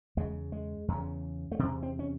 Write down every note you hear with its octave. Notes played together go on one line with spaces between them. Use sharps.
E2 C#3 G#3
G#3
E2 C#3
A3
E2 C3 C4
C4
C#4